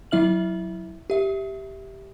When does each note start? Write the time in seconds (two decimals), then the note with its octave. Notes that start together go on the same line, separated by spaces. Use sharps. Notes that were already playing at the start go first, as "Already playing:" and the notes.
0.11 F#3 E4 E5 F6 F#7
1.10 G4 E5